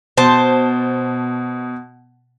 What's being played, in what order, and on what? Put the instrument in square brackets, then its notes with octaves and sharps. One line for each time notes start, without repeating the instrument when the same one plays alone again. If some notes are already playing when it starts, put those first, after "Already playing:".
[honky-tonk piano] B2 [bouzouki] C5 A5